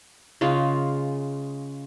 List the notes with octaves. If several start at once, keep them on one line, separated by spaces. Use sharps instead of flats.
C#3 G#3 F4